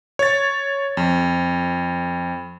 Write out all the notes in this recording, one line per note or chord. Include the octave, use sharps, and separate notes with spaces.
C#5 A6
F2